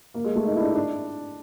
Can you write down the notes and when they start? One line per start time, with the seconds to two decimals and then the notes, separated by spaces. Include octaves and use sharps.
0.14 A#3
0.24 G#3
0.36 A3
0.45 D#4
0.56 E4
0.61 D4
0.65 D#4
0.75 D4